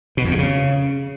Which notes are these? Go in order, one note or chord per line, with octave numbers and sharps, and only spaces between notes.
B2
F2
A#2
C#3